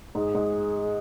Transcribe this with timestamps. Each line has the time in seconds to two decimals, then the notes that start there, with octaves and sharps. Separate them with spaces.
0.15 G#2 G#4
0.35 G#2